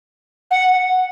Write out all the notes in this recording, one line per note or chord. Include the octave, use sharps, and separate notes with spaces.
F#5